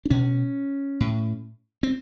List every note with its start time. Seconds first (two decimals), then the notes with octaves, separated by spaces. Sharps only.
0.05 D4
0.10 B2 C#4
1.00 A2
1.83 C4